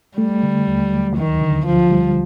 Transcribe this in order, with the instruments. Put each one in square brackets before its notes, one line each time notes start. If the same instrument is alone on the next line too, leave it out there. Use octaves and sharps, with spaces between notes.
[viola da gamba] G3 [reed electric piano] A3
[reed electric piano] D3
D#2
F#3
[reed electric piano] D2 [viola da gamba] D#3
[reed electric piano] D3
[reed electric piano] D2 [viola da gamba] F3
[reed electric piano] G3